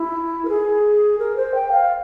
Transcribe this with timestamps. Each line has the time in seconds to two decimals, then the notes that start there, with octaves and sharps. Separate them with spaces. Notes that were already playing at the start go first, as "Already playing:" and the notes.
Already playing: E4
0.45 A#4
0.49 G#4
1.19 A#4
1.36 C5
1.54 G5
1.72 F5